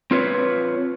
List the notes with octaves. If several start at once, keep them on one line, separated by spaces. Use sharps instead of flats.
C4 F4 B4 C#5